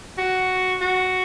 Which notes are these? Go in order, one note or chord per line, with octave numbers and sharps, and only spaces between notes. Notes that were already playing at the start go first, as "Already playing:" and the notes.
F#4
F#4